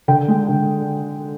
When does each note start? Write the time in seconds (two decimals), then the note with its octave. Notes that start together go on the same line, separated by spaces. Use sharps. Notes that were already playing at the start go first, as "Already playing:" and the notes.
0.08 D3 G5
0.28 G#3
0.48 D3